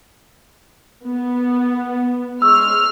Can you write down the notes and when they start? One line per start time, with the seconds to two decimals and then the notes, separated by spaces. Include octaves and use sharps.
1.04 B3
2.42 G#3 C#6 E6 F6